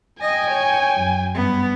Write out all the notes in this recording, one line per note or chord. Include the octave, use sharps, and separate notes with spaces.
D#5 G5 G#5
C#5
F#2
G2 B3